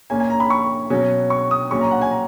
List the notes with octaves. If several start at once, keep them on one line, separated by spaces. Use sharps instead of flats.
A#2 A#3 C#4 G#5
G#5
A#5
B5
C#6
B2 F#3 C#4
C#6
D#6
A#2 F#3 C#4 C#6
A#5
F#5
G#5
A#5